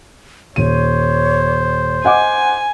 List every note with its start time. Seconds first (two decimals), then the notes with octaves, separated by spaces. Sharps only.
0.56 D#1 C5 C#5 D#7
2.05 D#5 F#5 G#5 D6